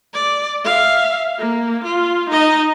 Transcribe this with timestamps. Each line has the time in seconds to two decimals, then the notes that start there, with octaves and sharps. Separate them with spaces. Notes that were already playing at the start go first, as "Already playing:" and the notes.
0.14 D5
0.65 E5 F5
1.38 A#3
1.84 F4
2.30 D#4 D#5